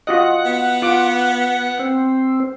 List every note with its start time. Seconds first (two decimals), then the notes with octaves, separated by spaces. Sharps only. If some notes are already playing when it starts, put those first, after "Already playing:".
0.07 F4 F#4 D#5 F#5
0.45 B3
0.82 F4 D6
1.79 C4